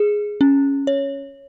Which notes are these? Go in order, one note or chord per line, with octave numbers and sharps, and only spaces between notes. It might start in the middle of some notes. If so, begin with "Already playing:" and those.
Already playing: G#4
C#4
C#5